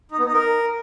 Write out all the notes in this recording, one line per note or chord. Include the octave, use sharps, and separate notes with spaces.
D#4
B3
D#4
A#4